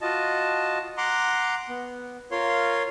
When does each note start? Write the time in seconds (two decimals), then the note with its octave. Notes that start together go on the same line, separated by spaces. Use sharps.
0.01 F4 F#4 D#5 A5
0.97 F#5 A#5 C6 D6
1.69 B3
2.31 F4 A#4 C#5 F5 C6